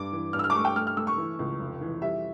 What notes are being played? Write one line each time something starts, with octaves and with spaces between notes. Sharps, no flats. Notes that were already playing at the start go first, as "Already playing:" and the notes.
Already playing: G2 D6
E3
G2 F6
E6
F6
D6
A3 C#6
G5
A3 F6
F6
A3 E6
C#6
E3
C#2
F1
E3
G3 E5